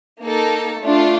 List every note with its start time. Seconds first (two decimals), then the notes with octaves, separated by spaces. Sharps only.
0.24 A#3 D#4 A4
0.82 A3 D4 F4